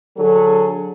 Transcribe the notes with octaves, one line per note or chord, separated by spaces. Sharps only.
D3 F#3 G#4 A4